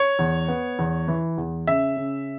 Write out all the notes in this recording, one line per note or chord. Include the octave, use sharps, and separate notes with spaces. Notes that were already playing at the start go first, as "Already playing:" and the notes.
Already playing: C#5
E2
B3
E2
E3
E2
C#3 E5
C#3